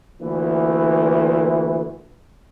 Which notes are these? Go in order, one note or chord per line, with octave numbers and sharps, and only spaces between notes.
D2 A#2 E3